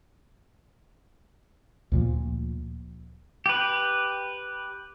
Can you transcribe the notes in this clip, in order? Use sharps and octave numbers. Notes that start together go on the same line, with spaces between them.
D2 A#2 F3
G4 B4